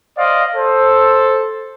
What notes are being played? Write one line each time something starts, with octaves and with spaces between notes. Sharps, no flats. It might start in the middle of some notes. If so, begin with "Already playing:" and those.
C5 D5 D#5 F5
A4 C5